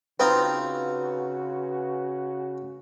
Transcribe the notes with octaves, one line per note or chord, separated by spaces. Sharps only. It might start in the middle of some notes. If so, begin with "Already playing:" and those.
C#3 C4 D#4 F4 F#4 B4